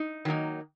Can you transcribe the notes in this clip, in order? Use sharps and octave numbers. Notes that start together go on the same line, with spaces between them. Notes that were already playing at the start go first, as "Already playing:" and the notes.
Already playing: D#4
D#3 F#3 A#3 D#4